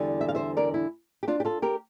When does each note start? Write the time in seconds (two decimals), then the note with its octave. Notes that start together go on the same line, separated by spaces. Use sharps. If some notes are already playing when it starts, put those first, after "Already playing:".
Already playing: E2 D3 G3
0.21 E5
0.29 F5
0.35 C5 E5
0.57 A#4 D5
0.74 E4
1.23 G4
1.28 D4 F4
1.40 G4
1.45 F4 A4
1.62 G4 A#4